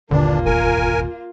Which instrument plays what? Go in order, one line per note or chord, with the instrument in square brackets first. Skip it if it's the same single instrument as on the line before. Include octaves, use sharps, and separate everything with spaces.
[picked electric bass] G1 D#2 A#2 [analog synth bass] D3 [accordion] E3 D4 [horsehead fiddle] A#3 F4
[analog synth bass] F1 [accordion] A#4 G#5